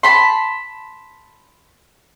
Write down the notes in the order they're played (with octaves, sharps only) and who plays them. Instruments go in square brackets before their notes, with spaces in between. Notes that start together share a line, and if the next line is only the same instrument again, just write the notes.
[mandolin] A5 B5 C6